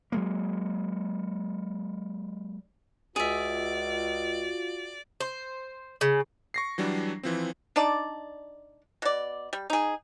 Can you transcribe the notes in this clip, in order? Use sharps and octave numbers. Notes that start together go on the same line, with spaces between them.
F#3 G#3 A#3
C#2 F4 F#4 G#4 D5 E5
C5
C#3
C#6 A#6 C7
E3 F#3 G3 D4
E3 F3 C4
D4 D#4 D5 A5
B2 D5
G3
D#4 G#4